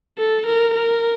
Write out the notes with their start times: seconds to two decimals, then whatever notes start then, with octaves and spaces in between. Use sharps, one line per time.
0.18 A4
0.46 A#4
0.74 A#4